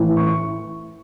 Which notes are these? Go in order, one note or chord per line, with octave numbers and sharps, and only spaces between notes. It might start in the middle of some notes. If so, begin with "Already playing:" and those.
Already playing: A2 E3
C#6